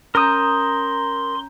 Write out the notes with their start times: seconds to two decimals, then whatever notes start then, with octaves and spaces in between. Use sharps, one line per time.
0.15 C#4 A#4 A#5 C6 D#6 G6